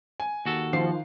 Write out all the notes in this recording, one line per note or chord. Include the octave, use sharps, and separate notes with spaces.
G#5
D#2 F#4 A4
D#3 F3 F5 C7